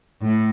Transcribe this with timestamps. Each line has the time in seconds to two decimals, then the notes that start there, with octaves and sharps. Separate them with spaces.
0.22 A2